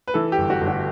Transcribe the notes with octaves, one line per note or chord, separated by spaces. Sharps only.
B4
E3 A4
G4
G1
F#4
G1
F#4